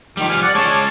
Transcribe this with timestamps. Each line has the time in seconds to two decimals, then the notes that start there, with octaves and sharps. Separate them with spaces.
0.17 D#3 F3 G3
0.29 G#5 F6
0.42 D5 F#5
0.55 G#3 C#4 C#5 A5 D6